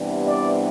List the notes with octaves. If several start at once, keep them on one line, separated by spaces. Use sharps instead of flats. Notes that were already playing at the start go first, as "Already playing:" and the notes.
Already playing: C3 E3 G3 B3 D4
D5